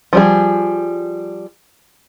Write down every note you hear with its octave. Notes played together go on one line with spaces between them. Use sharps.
F3 G3 G#4